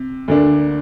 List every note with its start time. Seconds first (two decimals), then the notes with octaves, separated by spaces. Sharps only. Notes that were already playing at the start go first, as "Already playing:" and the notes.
Already playing: C3
0.28 D2 D3 A#3 D4